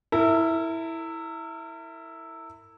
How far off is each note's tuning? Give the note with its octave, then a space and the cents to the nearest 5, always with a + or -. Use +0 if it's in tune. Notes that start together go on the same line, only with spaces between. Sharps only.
E4 -5 A#4 -40